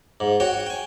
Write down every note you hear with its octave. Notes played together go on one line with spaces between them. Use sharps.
G#2
F#4 C#5 G5
G5 G#5